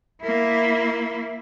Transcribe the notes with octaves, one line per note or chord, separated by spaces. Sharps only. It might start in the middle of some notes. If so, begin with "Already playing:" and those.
A#3 E4